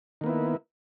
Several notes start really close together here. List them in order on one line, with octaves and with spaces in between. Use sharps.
D#3 A#3 B3 E4